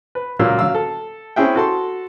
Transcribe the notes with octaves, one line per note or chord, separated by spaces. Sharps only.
B4
C#2 A#2 F#3 A#3 E6
F#3 F5 E6
A4
C4 C#4 E4 G#4 E5 G5
F#4 A4 C6